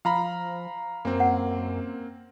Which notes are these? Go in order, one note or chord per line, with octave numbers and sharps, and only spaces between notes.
F3 F5 A#5 B5
F#2 A#3 C4
F#5